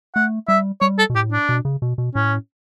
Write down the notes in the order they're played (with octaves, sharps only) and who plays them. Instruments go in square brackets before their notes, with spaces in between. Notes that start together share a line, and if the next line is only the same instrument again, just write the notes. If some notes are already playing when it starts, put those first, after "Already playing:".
[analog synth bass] A3 [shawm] F#5
[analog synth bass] G3 [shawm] E5
[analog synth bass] G3 [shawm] C#5
[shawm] A4
[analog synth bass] B2
[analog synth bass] A2 [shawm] G4
[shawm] D4
[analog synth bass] B2
C#3
B2
B2
[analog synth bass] A2 [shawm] C#4